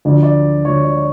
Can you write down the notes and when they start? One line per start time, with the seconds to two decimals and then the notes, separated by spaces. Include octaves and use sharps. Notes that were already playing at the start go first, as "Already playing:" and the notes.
0.05 D2 D3 F3 D5
0.23 D5
0.64 D2 D3 F3 C#5
0.84 D5
0.97 D5